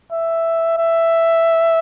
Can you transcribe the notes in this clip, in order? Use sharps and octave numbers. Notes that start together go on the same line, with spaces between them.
E5
E5